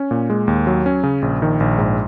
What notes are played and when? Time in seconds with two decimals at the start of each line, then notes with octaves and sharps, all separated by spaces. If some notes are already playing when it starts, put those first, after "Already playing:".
Already playing: C#4
0.11 A#2
0.30 G#3
0.48 D#2
0.67 F#3
0.86 C#4
1.03 C#3
1.22 A#1
1.42 D#3
1.60 A#1
1.78 G#2